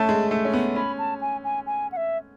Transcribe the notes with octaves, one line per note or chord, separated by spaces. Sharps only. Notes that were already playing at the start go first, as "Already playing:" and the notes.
Already playing: A3 C#4 A5
G#3
A3
C#4
B3
C#4 B5
A5
G#5
G#5
G#5
F#5
E5